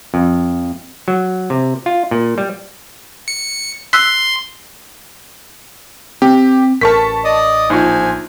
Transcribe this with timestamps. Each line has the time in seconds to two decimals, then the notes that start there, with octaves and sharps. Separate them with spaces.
0.14 F2
1.08 F#3
1.50 C3
1.86 F4
2.11 A#2
2.38 G3
3.28 C#7
3.93 C6 E6 F#6 B6
6.22 C4 G4
6.81 A1 A4 A#4 A5 C#6 B6
7.25 D5 D#5 D#6
7.70 A#1 D#4 F4 C5 G#5